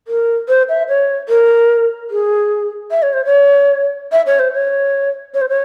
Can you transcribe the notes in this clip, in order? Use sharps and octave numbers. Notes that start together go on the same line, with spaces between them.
A#4
C5
E5
C#5
A#4
G#4
E5
C#5
C5
C#5
E5
C#5
C5
C#5
C#5
C5
C#5